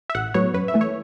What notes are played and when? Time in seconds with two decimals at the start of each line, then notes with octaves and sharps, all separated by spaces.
0.10 E5
0.15 A1 F#5
0.34 A2 F#3 B3 C#5
0.54 F#2 B4
0.68 E5
0.74 E3 A3
0.81 C#5